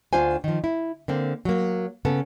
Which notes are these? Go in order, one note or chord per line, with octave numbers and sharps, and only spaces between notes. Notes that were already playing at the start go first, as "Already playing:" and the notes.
D2 D4 F4 C5 G#5
D#3 F3
E4
D3 A#3 C4
F#3 A#3
C#3 B3 A4